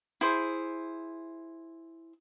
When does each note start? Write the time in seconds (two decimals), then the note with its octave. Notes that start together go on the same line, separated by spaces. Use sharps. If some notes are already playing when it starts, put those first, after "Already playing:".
0.21 E4 G#4 C5